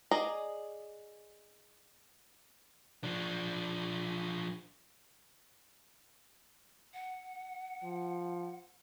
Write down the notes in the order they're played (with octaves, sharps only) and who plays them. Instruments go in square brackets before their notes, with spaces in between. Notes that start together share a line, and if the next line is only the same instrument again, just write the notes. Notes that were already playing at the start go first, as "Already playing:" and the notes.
[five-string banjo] G#4 D5 D#5 A#5
[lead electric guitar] F3 D4
[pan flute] F#5
[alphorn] F3